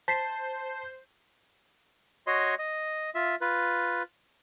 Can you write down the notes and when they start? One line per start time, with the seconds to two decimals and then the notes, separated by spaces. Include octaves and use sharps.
0.08 C5 A5 B6 C7
2.27 F#4 C#5 D#5 C6
2.59 D#5
3.15 F4 E5
3.41 F4 B4